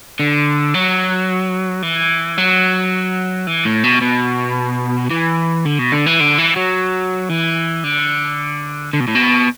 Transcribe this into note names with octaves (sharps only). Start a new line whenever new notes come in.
D3
F#3
E3
F#3
E3
A2
B2
B2
E3
D3
B2
D3
E3
D3
E3
F#3
E3
D3
D3
B2
A2
B2